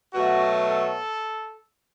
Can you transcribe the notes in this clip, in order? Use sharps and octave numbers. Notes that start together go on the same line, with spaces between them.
B2 F#3 A3 F#4
A4